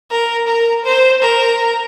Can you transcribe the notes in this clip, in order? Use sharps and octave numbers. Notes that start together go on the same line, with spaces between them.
A#4
A#4
C5
A#4